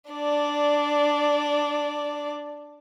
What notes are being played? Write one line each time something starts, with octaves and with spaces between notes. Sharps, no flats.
D4 D5